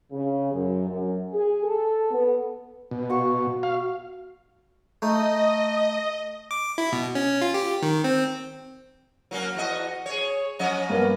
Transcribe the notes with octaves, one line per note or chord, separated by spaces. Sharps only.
C#3
F#2
F#2
G#4
A4
B3
B2
F#4 F5 C#6
F5
A3 D#4 D#5
D6
E4
B2
C#4
F4
G4
D#3
C4
F#3 A#3 C#4
E2 F#4 D#5
G#4 C#5
F3 C#4 D#5
G2 A#3 B3